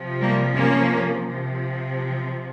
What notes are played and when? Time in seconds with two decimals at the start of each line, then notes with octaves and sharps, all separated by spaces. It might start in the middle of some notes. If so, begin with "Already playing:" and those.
Already playing: C3 F3
0.21 G3 A#3
0.56 A#3 C#4
1.25 C3 F3